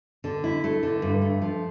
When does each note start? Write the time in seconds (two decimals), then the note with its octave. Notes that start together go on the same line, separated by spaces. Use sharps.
0.24 D3
0.44 E4
0.64 A3
0.83 D3
1.02 G2
1.22 A3
1.42 F3